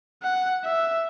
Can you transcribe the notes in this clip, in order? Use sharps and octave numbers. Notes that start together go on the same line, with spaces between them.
F#5
E5